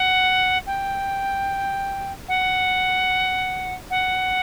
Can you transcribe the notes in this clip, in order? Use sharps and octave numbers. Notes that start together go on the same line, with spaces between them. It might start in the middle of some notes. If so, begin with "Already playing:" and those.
Already playing: F#5
G5
F#5
F#5